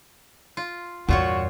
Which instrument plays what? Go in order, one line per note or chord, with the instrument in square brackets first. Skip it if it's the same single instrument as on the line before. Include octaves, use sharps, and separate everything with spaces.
[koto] F4
[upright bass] E2 G2 [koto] A#2 F4 C#5 [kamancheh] F#4